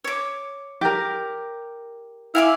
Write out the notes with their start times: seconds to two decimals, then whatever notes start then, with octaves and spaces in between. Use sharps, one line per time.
0.04 C#5 D6
0.81 G4 A#4
2.35 E4 F5 G#5 D6